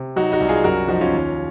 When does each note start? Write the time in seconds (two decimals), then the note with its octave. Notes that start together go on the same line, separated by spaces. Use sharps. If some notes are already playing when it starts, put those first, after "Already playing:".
Already playing: C3
0.16 F#3 D#4 F#4
0.32 D#4 F#4
0.40 C2
0.49 F4 G#4
0.64 F#2 F#4 A#4
0.88 F3 D#4 F#4
1.01 C#4 F4
1.12 D#2